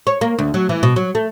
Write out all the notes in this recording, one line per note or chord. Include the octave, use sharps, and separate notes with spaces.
C#5
A#3
D2
F#3
E3
B2
F#3
A3